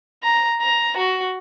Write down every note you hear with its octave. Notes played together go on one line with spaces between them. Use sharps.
A#5
A#5
F#4